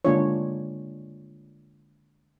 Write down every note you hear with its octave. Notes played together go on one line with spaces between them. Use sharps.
D3 G#3 A#3 D4 F4 C#5